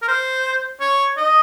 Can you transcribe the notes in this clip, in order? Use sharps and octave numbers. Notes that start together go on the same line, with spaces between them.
A#4
C5
C#5
D#5